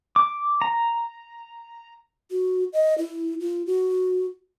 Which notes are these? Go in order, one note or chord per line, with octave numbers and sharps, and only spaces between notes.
D6
A#5
F#4
D#5
E4
F4
F#4